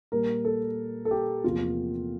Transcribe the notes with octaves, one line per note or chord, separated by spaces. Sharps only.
A#2 G3 A#3 A#4
A4
A4
G4
E2 C3 F3 A#3 F4